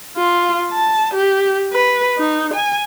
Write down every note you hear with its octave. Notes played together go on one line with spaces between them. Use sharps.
F4
A5
G4
B4
D#4
G#5